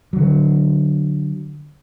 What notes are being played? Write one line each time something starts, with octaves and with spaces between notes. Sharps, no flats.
D3 F#3